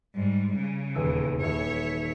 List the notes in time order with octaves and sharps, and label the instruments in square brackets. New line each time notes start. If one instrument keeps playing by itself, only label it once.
[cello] G#2 G3
C#3
[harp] D#1 E2 E6
[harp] D#1 A4 F5 [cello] C#5 E5